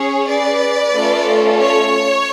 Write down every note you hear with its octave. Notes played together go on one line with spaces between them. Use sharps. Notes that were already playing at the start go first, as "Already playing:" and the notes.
Already playing: C#4 G#4 C#5
B4 D5
A3 C#4 F4 A4
C#5